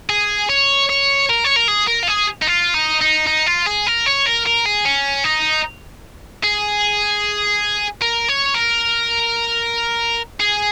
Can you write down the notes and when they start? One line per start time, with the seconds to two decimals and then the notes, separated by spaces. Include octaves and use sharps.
0.09 G#4
0.50 C#5
0.89 C#5
1.29 A#4
1.44 C#5
1.56 A#4
1.68 G#4
1.88 A#4
2.03 F4
2.08 G#4
2.42 D#4
2.47 F4
2.74 D#4
3.01 D#4
3.27 D#4
3.46 F4
3.67 G#4
3.87 A#4
4.06 C#5
4.26 A#4
4.46 A#4
4.65 G#4
4.85 C#4
5.24 D#4
6.44 G#4
8.02 A#4
8.28 C#5
8.54 A#4
10.40 G#4